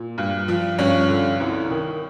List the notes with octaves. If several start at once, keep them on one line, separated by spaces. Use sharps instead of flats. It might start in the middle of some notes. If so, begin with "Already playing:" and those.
Already playing: A#2
G2
F3
G2 C#4
D3
C2
D#3